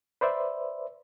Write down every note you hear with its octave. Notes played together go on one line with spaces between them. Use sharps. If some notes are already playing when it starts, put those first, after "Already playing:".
B4 C5 D5 E5